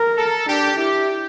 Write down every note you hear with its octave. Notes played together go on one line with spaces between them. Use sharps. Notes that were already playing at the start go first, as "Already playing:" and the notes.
Already playing: A#4
A4
D4 G4
E4 G4